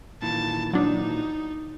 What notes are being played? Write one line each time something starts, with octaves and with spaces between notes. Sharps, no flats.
A#2 D#3 E3 A5
F#3 D4 D#4